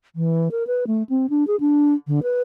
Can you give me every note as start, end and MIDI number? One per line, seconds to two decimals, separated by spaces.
0.16 0.49 52
0.51 0.66 70
0.67 0.84 71
0.87 1.03 57
1.09 1.26 60
1.30 1.47 62
1.47 1.56 68
1.60 1.94 62
2.07 2.20 50
2.23 2.42 71